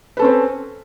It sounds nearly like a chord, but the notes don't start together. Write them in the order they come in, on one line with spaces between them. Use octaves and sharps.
B4 A4 C#4 C4